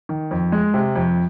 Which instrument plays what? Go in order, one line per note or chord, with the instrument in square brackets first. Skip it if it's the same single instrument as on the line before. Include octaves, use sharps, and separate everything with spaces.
[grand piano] D#3
F2
G#3
C3
F2